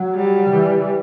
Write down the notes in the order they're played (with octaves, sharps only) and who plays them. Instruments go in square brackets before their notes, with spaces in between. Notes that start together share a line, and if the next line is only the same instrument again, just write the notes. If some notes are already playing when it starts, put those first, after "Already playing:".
Already playing: [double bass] F#3
[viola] G3
[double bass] E3